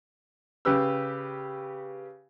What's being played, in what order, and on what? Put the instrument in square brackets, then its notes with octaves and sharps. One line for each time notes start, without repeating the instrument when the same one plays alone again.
[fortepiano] C#3 G4 B4 E6